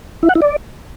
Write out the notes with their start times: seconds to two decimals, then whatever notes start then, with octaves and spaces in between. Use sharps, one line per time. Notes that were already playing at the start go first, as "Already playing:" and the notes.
0.23 E4
0.29 F#5
0.35 E4
0.42 D5